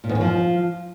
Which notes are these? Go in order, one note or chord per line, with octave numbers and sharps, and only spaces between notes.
A#2
E2
F#2
F3